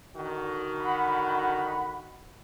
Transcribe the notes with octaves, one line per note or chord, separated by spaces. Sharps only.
D3 D#3 F#4
F#5 B5